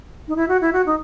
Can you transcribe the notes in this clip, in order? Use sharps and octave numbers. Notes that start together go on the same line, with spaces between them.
D#4
E4
F#4
E4
F#4
D#4